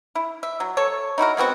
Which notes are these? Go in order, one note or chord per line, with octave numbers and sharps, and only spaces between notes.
E4
E5
F#3
A4 C#5
D#4 E4 F#4 A#4
G#3 B3 C4 F#4